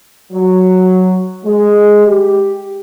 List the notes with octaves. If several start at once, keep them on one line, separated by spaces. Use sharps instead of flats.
F#3
G#3
G4